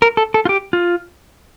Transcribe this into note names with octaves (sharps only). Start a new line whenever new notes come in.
A#4
A4
A4
F4
G4
F4